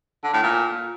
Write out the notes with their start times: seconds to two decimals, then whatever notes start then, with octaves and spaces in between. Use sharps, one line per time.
0.24 D3
0.34 A2
0.43 A#2